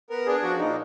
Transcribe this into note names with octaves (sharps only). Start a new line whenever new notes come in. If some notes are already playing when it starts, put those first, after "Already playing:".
B3 A#4
D4 G#4
F3 F#4
A#2 D#4